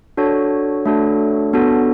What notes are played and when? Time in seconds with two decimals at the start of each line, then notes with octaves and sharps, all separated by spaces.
0.17 D4 F#4 A4 C#5
0.86 A3 D4 F#4 A4
1.53 B3 D4 F#4 A4